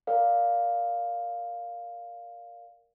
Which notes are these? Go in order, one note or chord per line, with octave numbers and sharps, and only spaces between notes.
A#4 D5 F5